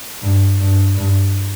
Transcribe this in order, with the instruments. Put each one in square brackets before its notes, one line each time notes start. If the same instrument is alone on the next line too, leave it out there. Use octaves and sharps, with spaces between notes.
[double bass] G2
G2
G2